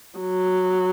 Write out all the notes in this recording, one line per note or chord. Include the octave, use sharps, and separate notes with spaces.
F#3